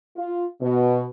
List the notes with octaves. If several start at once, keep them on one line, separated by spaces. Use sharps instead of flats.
F4
B2